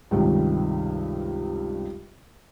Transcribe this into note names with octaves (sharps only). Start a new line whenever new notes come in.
C#2 G2 C3 D#3